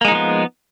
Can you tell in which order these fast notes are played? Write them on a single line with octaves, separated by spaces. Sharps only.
A#3 G#3 D#4 F3 B3